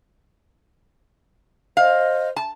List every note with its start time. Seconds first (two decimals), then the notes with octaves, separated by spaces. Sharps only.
1.77 C5 D#5 F5
2.36 A5